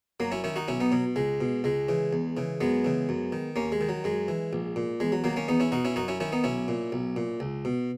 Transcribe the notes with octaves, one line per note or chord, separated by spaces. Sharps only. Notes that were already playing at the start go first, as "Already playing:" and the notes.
F#2 F#3 A#3
C#4 E4
D#3 C#4 E4
D#4 F#4
B1 C#4 E4
B3 D#4
B2 F#3
C#2 G#3
B2
C#2 G#3
C#3 E3
E2
C#3 E3
F#2 G#3 B3
C#3 E3
F#2
D#3
D#2 A#3 C#4
G#3
D#3
F#3
F#2 G#3
E3
A#1
A#2
E2 G#3
F#3
D#3 F#3 A#3
A#3 C#4
E2 B3 D#4
C#4 E4
B2 D#4 F#4
C#4 E4
F#2 D#4 F#4
C#4 E4
D#3 C#4 E4
B3 D#4
B1 C#4 E4
A#2
B1
A#2
C#2
B2